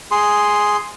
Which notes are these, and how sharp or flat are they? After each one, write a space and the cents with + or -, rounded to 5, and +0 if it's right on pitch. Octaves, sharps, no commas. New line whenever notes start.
G#4 +0 C6 +0